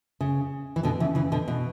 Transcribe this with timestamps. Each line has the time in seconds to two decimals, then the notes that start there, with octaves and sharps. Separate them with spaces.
0.21 C#3
0.76 E3
0.83 B2 D3
1.00 C#3 E3
1.15 C#3 E3
1.32 B2 D3
1.48 B2